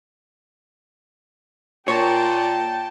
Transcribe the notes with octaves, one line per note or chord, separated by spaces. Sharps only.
A#2 C#5 G5 A5